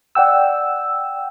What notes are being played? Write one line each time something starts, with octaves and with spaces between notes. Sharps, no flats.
D5 F#5 G5 E6